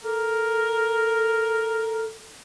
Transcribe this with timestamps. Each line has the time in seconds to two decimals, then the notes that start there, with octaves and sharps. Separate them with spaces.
0.03 A4 A#4